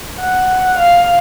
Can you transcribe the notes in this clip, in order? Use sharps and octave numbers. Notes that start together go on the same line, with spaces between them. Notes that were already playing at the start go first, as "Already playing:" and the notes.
F#5
F5